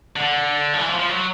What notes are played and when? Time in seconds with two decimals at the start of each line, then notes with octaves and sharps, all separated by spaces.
0.16 D3
0.74 F3
0.78 E3
0.89 F3
0.99 F3
1.09 F#3